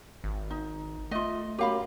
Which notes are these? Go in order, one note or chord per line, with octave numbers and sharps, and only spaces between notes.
G#1
D#4
A3 F4 D#5
F#2 G4 F5 B5